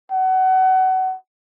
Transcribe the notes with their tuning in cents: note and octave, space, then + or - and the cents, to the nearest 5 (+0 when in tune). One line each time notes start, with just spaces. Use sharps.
F#5 +25